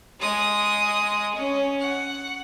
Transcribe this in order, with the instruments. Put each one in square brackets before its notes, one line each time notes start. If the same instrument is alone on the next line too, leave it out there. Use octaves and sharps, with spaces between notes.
[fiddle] G#3 D#6
C#4
F#5